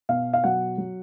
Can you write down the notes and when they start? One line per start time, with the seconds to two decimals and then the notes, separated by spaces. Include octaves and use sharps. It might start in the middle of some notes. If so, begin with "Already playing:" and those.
0.09 B2 F5
0.33 F5
0.44 F#3 F#5
0.78 F#3